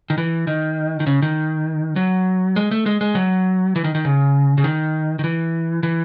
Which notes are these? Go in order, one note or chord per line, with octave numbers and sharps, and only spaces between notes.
D#3
E3
D#3
D#3
C#3
D#3
F#3
G#3
A3
G#3
G#3
F#3
E3
D#3
D#3
C#3
C#3
D#3
D#3
E3
E3